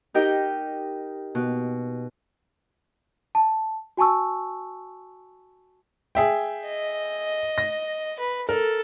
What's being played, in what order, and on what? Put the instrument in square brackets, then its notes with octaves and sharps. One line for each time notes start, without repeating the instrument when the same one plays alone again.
[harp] D#4 G4 A#4 D#5 G5
B2
[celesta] A5
F#4 G#5 A5 C#6 E6
[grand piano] G#4 E5 G5
[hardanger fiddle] D#5
[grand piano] A#6
[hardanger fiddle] B4
[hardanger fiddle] A4 [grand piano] A#4